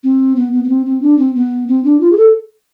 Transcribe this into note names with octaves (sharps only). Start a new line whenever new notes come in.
C4
B3
B3
B3
C4
C4
D4
C4
B3
C4
D4
F4
G#4
A4